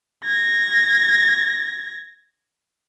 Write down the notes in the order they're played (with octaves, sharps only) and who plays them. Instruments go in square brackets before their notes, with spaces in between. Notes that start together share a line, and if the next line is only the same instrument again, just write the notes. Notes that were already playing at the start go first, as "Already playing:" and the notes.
[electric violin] G#6 A#6